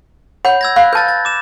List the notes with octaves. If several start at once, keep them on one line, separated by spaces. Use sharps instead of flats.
C#5 F#5 B5 G6
E6 G#6 A#6
F5 B5 F#6
B4 A5 G6 A6
A6
D6 E7